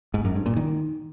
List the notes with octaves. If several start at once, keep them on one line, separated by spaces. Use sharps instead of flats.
G#2
F#2
G2
A#2
D#3